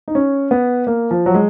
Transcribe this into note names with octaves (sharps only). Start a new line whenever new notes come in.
D#4
C#4
B3
A#3
F3
F#3
G#3